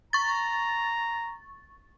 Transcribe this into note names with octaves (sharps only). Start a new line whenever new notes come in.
A#5 C#6 A6